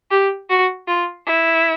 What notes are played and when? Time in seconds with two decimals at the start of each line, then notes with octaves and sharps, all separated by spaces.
0.11 G4
0.50 F#4
0.88 F4
1.27 E4